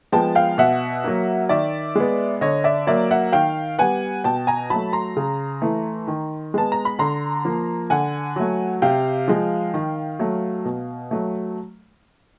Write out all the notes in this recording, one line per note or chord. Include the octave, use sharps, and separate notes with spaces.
F3 G#3 B3 G5 A5
F5 G5
B2 E5 F#5
F#3 A#3
D#3 D5 E5
G#3 B3
D3 C#5 D#5
D5 E5
F#3 A#3 D5 E5
E5 F#5
D#3 F5 G5
G3 B3 F#5 G#5
B2 G5 A5
G#5 A#5
F#3 A3 A5 B5
A#5 C6
C#3
E3 A3
D#3
G#3 B3 A5
A#5
B5
D3 A#5 C6
F3 A#3
D3 F#5 G#5
F#3 A3
C3 F5 G5
F3 G#3
D#3
F#3 A3
B2
F#3 A3